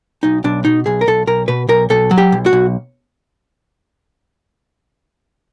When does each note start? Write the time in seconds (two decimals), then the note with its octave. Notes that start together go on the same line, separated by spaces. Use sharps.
0.23 B1 D#4
0.44 B1 D4
0.65 B2 D#4
0.86 B1 G#4
1.01 A#4
1.07 B1 A4
1.27 B1 A#4
1.48 B2 B4
1.69 B1 A#4
1.90 B1 A4
2.11 F#3
2.18 G4
2.32 B1
2.46 F#4
2.53 B1